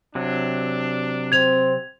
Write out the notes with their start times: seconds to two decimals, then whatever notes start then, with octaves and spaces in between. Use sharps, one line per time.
0.15 C3 F#3 D4
1.32 C4 G#6 F7